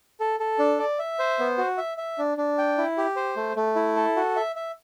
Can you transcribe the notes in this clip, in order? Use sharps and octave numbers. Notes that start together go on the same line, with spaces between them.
A4
A4
D4
D5
E5
C5
B3
F#4
E5
E5
D4
D4
G5
E4
G4
C5
A3
A3
E4
A4
F#4
E5
E5